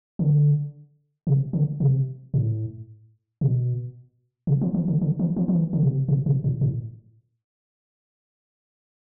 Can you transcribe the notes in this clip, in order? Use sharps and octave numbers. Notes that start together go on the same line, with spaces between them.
D3
C3
D3
C3
A2
B2
C3
F3
E3
D3
D3
E3
F3
F3
E3
D3
B2
C3
B2
B2
A2
A2